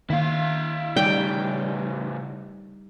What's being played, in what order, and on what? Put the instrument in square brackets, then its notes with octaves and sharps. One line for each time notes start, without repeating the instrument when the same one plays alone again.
[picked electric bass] D#3 A#3 [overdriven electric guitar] E4 F5
[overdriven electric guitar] A2 C#3 [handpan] G3 D#4 D5 [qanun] G5